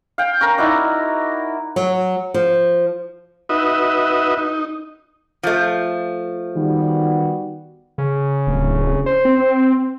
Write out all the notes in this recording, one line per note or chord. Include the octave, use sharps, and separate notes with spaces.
F5 G5
C#4 A#4 A#5
D#4 E4 F#4 D5
F#3
F3
D#4 F#4 B4 D#5 E5
D#4
F3 A3
D#3 G3 B3 F#4
C#3
D1
C5
C4